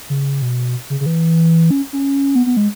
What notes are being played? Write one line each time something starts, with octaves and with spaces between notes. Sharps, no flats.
C#3
B2
C#3
C#3
E3
C#4
C#4
B3
B3
G#3